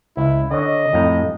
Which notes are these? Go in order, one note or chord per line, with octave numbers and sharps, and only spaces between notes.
C#2 E4
D3 C#5 D#5
F2 A2 A#5